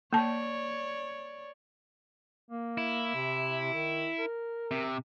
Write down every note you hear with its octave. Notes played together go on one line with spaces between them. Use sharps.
A#3 C#5 D5 A5
A#3
E4
C3
D#3
A#4
C3